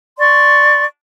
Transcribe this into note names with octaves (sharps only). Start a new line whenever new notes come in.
D5 C6 C#6